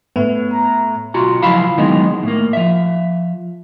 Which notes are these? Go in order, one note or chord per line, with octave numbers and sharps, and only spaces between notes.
A2 B3
A#5
B1 F4 F#4 A#5
C#2 F3 F#3 E4 F5 B5
D#3 E3 F#3 G#3 B3 D#4
A2 A#3
F3 E5